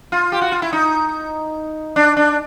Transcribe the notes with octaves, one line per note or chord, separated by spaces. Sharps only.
F4
G4
F#4
F4
E4
D#4
D4
D4